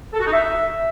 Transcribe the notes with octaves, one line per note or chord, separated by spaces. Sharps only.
A4
F#4
D#4
E5